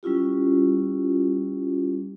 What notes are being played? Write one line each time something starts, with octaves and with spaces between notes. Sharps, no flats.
G3 C#4 E4 F4 G4